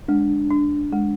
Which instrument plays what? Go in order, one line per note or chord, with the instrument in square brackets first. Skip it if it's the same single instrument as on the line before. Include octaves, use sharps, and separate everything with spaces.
[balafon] G#3 [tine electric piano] D4
[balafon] D4
G#3